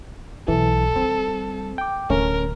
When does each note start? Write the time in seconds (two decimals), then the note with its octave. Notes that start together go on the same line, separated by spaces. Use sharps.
0.48 B1 E3 A4
0.96 G3 C4
1.78 G5 D6
2.10 D1 D3 A3 C#4 A#4